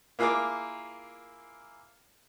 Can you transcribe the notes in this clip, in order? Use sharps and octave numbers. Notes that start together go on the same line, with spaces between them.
A#3 E4 F4 G#4 A#4 D6